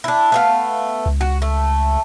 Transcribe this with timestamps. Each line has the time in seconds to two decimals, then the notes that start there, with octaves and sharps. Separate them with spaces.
0.04 D4 E4
0.32 A3 B3 F5
1.06 C#2
1.21 F#4
1.42 A3